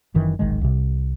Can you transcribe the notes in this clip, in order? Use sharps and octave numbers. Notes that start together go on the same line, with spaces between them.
F#1 F#2 D#3 E3
D1 G#1 D#3 G#3
C2 C3